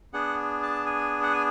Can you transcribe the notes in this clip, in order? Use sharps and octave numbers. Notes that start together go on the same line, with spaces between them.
B3 D4 G#4 F#5
A5
G#5
F#5
G#5